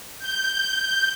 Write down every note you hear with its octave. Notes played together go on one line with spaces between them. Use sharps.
G6